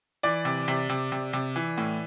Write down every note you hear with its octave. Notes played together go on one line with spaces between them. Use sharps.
E3 D5
C3
C3
C3
C3
C3
E3
A2